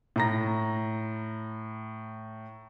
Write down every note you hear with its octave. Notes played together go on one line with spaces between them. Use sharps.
A2 A#5 A#6